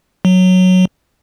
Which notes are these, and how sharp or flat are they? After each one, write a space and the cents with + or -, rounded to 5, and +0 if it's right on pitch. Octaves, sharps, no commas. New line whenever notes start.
F#3 -5